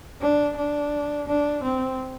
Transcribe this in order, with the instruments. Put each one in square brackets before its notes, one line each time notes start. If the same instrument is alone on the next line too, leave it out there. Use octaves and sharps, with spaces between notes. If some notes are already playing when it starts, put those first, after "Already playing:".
[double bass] D4
D4
D4
C4